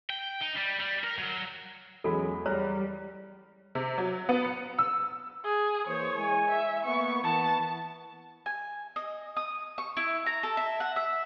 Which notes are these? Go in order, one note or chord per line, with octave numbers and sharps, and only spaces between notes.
G5
D#4
G3
G3
A#4
F#3
E2 F#3 G#3 C#4 A4 B5
G3 C#5 A#5 F6
C3
F#3
B3
C#7
E6
G#4
E3 A#3 C5 C#5
G#3 E4 G#5
E5
A#3 B3 C#6
E3 B3 A5
G#5
D#5
D#6
C#6
E4
A#5
A4
E5
F#5
E5